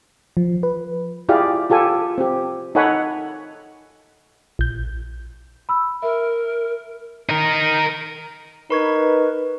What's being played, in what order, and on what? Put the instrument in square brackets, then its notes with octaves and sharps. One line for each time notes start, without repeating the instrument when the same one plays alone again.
[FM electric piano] F3
B4
[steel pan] E4 F4 G4 G#4 D5 F5
F4 G4 A4 G#5
C4 G4
D#4 A4 C#5 F#5 G#5 B5
[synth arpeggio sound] A#1 G6
[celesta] B5 E6
[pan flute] A#4 [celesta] E5
[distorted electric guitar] D#4 A#4
[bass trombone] D#4 [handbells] A#4 C#6 G#6 [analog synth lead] B4